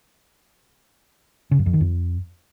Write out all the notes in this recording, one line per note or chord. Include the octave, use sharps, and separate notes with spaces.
C#3
F#2
F2
D#3
F2